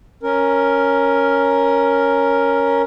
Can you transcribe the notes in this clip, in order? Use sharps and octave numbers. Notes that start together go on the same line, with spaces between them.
C#4 A#4